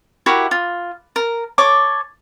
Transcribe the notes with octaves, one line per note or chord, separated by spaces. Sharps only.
E4 F#4 G4 A#4
F4
A#4
A4 C#5 D6